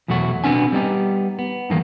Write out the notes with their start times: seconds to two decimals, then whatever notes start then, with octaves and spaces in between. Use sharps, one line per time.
0.08 E2 B2 F#3 A3 F#4
0.44 B2 B3 C4 D4 G#5
0.72 G3 B3 D#4 G4
1.39 B3
1.70 G2 D#3 E3 A3 A#3